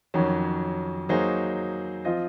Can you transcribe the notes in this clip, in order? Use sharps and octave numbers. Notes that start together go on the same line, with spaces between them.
F2 D#3 F#3 C#4
F#3 A#3 D#4 G#4 C5
F3 C4 F4 C5 D#5